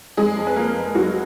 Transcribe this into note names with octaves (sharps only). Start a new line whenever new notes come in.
F1 G#3 G#4
F2
B4
F3 A#3 A#4
F1
F1 F#3 F#4